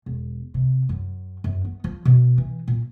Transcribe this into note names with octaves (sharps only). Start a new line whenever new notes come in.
E1
C3
F#2
F#2
B3
F3
B2
E3
A#2